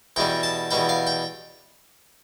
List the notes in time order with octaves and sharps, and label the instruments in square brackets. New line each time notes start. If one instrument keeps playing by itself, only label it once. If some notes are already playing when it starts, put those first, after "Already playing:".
[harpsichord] E2 B2 G3 G5
A5
E2 B2 G3 G5
F5
G5